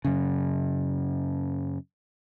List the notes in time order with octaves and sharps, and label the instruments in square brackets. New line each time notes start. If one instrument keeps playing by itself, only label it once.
[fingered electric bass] F#2 C#3